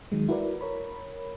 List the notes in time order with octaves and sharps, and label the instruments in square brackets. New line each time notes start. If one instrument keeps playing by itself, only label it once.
[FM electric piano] D#3 F#3 G#3
E4 F#4 A#4 B4 D5
A#4 C#5 B5